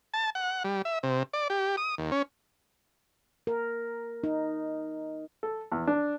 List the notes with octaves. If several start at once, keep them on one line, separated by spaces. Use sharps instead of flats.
A5
F#5
G3
E5
C3
D5
G4
D#6
D#2
C#4
A#4
D#4
A4
E2
D4